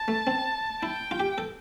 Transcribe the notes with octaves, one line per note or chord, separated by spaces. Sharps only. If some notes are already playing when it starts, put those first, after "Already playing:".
Already playing: A5
A3
C4
E4 G5
F4
G4
A4